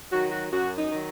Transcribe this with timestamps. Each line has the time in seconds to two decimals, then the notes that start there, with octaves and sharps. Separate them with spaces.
0.12 D#3 F#3 F#4
0.32 F#4
0.52 F#2 F#4
0.78 D#4
0.91 D#3 F#3